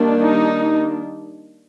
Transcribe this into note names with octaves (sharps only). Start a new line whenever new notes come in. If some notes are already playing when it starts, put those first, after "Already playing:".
Already playing: D#3 G3 A#3 D4
D#4